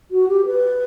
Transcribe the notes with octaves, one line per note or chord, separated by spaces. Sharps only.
F#4
G4
B4